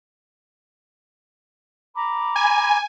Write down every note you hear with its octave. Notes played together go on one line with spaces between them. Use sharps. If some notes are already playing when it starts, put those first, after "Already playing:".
A#5 B5 D6
G#5